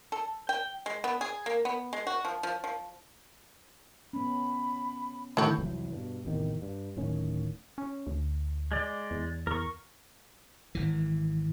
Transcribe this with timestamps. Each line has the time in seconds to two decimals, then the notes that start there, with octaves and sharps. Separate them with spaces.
0.12 A4
0.49 G5
0.86 G#3
1.04 B3
1.21 G#4
1.46 A#3
1.65 B3
1.93 G#3
2.07 F#4
2.25 F3
2.43 F3
2.64 F3
4.13 B3 C#4 B5
5.37 A2 D3 D#3 F#3 A3 F#4 G6
5.58 C2 F2 E3 F#3
5.92 G2 B2
6.25 A1 E2 C3 D#3
6.62 G2
6.96 D1 A2 D#3 C#4
7.78 C#4
8.07 D2
8.72 G#3 D5
9.11 E2
9.47 E2 A#4 C#6
10.75 G#1 E3